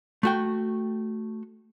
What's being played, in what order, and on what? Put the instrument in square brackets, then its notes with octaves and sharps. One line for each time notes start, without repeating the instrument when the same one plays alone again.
[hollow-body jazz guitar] A3 F#4 G5